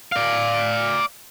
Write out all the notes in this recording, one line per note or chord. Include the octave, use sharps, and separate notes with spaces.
D5 F5